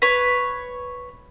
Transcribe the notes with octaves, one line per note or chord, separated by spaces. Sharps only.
B4 C#5